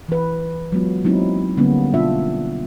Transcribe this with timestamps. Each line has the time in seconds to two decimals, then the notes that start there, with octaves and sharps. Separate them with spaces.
0.08 E3 B4
0.72 F#3 G#3 B3 F4
1.05 F#3 G#3 A#3 C4 D#4 E4
1.57 D3 G3 A#3 B3 C#4 D4
1.94 B2 D4 F4 E5